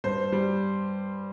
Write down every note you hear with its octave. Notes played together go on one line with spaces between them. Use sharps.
G2 C5
G3